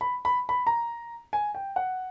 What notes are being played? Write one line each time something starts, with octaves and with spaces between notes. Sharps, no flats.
B5
B5
B5
A#5
G#5
G5
F#5